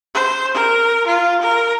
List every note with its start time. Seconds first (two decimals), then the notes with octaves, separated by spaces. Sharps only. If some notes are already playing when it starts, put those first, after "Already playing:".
0.15 C5
0.54 A#4
1.07 F4
1.41 A#4